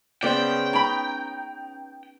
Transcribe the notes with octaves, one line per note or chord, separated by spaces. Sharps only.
C#3 B3 C#4 C5 D5 G5
C#4 D#4 A#5 B5